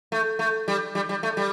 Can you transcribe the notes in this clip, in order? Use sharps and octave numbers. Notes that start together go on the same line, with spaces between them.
A3
A3
G3
G3
G3
A3
G3